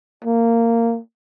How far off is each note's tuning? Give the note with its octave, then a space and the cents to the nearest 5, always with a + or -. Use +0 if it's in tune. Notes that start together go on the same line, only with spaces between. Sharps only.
A#3 -15